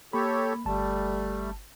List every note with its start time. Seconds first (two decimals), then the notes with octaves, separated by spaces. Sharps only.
0.13 A#3 G4 A4 C#5 B5
0.66 G1 G3 A3 A5